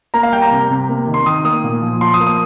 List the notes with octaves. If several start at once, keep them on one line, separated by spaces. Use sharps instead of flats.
A#3 A#5
F5
G3 G5
A#5
C3
C3
A#3
D#3
C6
D#3 D#6
A#3 D#6
A#2
F3
F3 C6
D#6
A#3
D#6